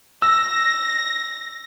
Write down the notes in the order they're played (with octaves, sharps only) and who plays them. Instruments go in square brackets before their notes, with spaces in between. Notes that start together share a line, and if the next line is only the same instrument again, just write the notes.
[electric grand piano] E6 [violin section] A#6